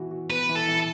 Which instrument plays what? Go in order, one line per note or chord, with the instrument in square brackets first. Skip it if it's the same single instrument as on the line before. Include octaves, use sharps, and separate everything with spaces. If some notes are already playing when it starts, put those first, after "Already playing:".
Already playing: [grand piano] E3 B3 F#4
F#4
[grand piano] B3 [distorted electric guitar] B4
[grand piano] E3
[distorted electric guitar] A4
[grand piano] E3